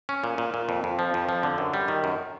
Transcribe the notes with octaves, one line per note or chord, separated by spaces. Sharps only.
C#4
A#2
A#2
A#2
F2
F2
F3
F2
F3
D3
F#2
G3
D#3
F#2